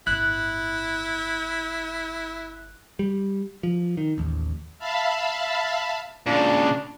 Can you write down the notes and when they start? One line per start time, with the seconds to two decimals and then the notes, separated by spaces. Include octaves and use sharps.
0.07 G1 A2 E4 F#6
2.99 G3
3.63 F3
3.97 D#3
4.18 A1 D#2
4.79 E5 F5 A5 B5
6.27 A#2 C#3 D4